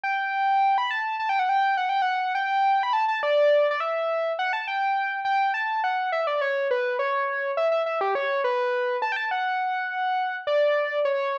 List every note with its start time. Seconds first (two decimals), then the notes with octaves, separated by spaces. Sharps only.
0.04 G5
0.78 B5
0.91 A5
1.19 A5
1.29 G5
1.39 F#5
1.49 G5
1.77 F#5
1.89 G5
2.02 F#5
2.35 G5
2.83 B5
2.93 A5
3.08 A5
3.23 D5
3.71 D5
3.80 E5
4.39 F#5
4.53 A5
4.68 G5
5.25 G5
5.54 A5
5.84 F#5
6.12 E5
6.27 D5
6.41 C#5
6.71 B4
6.99 C#5
7.57 E5
7.72 E5
7.86 E5
8.01 G4
8.15 C#5
8.44 B4
9.02 A5
9.12 G5
9.16 A5
9.31 F#5
10.47 D5
11.05 C#5